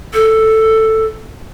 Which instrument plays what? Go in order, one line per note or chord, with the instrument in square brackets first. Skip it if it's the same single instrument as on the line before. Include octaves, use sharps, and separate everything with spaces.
[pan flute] A4